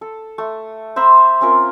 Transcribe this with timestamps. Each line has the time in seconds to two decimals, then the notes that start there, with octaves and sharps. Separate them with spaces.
0.01 A4
0.38 A3
0.96 C5 E5 A#5 B5
1.41 C4 C#4 F4 A#4